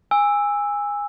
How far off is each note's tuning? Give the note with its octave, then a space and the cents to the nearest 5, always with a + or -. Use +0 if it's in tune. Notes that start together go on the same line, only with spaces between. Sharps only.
G#5 -20 E6 +0